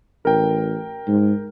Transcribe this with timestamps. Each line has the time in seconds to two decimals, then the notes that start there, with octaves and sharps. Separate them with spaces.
0.25 A1 A#4 G5
1.07 G#2